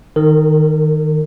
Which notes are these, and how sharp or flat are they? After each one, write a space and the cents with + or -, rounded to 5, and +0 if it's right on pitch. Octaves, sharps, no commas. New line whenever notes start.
D#3 +0 A#4 -40